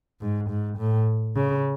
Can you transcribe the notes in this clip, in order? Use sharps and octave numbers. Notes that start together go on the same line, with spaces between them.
G#2
G#2
A2
C#3